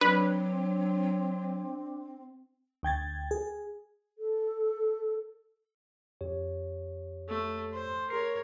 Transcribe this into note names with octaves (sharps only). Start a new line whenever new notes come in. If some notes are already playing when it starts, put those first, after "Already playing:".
F#3 C4 D4 B4
D2 G5 G#6 A6
G#4
A4
F2 G4 C#5
A3
C5
G#4 A#4 C#5 C7